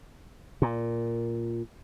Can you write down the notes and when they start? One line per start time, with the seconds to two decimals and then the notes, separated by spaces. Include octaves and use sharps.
0.62 A#2